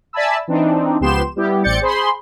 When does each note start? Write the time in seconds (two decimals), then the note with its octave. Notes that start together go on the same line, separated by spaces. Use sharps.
0.13 D5 E5 G#5 A5 B5 E6
0.47 E3 C4 D4 D#4
1.00 C#2 F3 B3 G4 C6 E7
1.36 G3 B3 E4 G4
1.64 A1 C4 D5 G6 A6 C#7
1.81 G#4 C5 B5 C6